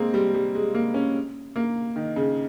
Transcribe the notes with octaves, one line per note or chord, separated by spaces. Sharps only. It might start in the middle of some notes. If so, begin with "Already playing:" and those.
Already playing: G#3 A#3 C4
G3
G3
G#3
A#3
C#4
A#3
D#3
C#3